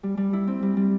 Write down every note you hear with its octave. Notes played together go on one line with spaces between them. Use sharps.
G3
G3
E4
C4
G3
G3